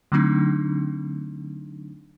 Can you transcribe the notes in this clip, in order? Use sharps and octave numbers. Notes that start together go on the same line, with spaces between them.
D3 F#3 A3 C4 D4 D#4